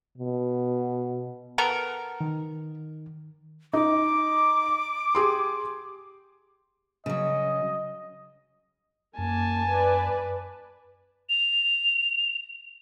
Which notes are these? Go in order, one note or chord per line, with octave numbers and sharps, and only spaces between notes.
B2
B3 A4 A#4
D#3
D#4 D6
G4 G#4 C6
C#3 F#3 D#5
F#2 A#3 G#5 A5
B4 D5
F7